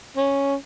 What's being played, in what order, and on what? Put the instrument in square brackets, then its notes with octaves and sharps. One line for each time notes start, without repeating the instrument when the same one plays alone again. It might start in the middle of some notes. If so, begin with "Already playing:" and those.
[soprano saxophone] C#4